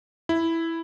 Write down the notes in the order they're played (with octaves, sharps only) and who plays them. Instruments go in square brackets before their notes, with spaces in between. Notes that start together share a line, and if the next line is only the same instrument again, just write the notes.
[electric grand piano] E4